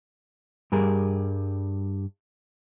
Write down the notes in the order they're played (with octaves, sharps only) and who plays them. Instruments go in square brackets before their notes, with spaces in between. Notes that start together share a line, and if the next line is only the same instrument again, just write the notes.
[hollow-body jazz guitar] G2 G3 G#4 A#4